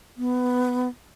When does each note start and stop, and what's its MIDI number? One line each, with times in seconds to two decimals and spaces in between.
0.17 0.89 59